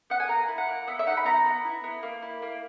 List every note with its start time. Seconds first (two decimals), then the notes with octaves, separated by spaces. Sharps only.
0.10 B3 F#5
0.20 G#5
0.28 A#3 A#5
0.48 E4
0.58 F#5
0.68 A#3
0.87 B3 E5
0.99 E5
1.06 D#4 F#5
1.17 B5
1.26 B3 A#5
1.46 B3
1.65 E4
1.84 B3
2.03 A#3
2.22 E4
2.42 A#3